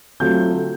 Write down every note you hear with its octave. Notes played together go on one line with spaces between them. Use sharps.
D3 F#3 A3 C4 F4 G6